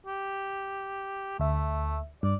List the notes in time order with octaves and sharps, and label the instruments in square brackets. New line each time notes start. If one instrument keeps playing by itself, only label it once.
[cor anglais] G4
[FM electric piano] D2 E5 [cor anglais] A3
[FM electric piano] G2 [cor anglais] D5